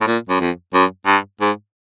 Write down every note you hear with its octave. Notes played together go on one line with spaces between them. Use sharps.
A2
A#2
F#2
F2
F#2
G2
G#2